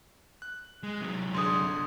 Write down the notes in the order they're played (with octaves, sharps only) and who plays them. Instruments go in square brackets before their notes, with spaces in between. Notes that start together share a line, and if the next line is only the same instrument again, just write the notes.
[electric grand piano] F#6
[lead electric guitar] G#3
C3 F#3
[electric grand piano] G1 D3 G#4 [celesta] C6 D#6